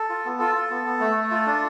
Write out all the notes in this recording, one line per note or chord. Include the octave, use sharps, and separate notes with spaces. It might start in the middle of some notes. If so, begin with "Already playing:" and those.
Already playing: A4
F4
B3
F4 A4
F4
B3
B3
A3
A3
F4
D4